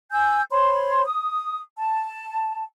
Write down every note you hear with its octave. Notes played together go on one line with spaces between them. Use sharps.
G#5 E6 G6
C5 C#5 B5 C6
D#6
A5